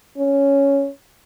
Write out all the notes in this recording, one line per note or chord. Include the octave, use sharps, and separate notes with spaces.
C#4